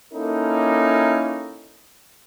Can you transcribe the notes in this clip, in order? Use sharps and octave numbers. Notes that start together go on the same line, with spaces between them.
A#3 C#4 D#4 E4 A4